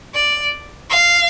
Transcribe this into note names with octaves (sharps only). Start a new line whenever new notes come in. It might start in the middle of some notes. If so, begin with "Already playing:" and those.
D5
F5